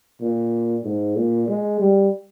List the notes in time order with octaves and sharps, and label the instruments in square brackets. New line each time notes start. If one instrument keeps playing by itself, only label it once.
[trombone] A#2
G#2
A#2
G#3
G3